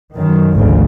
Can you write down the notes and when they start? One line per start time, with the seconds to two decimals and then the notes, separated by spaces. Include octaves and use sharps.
0.14 F#2 D#3
0.53 G#1 D2 C#3 F3